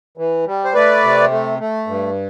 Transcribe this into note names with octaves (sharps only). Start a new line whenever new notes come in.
E3
G3
C5
A3 B4 D5
C3
A3
A3
G2